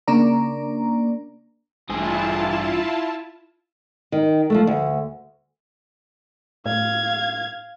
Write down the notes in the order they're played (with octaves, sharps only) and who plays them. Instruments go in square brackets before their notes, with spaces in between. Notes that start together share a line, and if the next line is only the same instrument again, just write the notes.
[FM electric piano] C#3 A#3 D4 D5 A#5
[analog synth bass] A1 [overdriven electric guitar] G2 G#4 [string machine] E4 F4 A5
[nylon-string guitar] D#3
F3 F#3 A3
D2
[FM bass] A2 [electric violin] F5 G#6